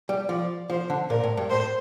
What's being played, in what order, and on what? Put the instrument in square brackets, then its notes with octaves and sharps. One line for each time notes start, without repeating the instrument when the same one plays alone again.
[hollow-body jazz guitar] G3
[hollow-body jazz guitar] F3 [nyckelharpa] D5
[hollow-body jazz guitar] F3 [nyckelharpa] C5
[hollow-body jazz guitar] D3
[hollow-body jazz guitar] A#2 [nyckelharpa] A#4
[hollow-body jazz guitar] A2
G2
[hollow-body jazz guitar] A2 [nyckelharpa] C5